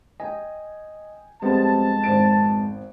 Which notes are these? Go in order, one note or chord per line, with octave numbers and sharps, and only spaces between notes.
D#5 G5 G#5
F2 G3 G#3 B3 C4 A5
G#1 C5 D7